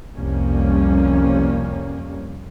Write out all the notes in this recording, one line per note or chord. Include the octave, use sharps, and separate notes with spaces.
C2 F2 G3 A#3 C#4